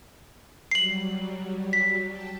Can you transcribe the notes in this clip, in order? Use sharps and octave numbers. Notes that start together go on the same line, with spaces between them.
F#3 G3 C7 F#7
B6
G5 A5